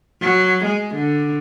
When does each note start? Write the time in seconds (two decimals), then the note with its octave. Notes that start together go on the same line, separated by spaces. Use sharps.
0.22 F#3
0.65 G#3
0.95 D3